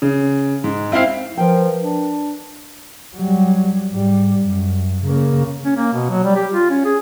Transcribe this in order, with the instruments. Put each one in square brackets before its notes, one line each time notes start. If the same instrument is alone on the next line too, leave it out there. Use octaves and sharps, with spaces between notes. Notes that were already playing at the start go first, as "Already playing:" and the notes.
[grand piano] C#3
G#2
C4 E4 C5 F5 C7
[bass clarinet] F3 [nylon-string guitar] A#4 B4 G5
[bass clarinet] D4
[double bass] F#3 G3
G#2 G3
F#2
C#3 A#3
[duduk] C#4
A#3
B2
F#3
G3
G4
F4
C#4
G#4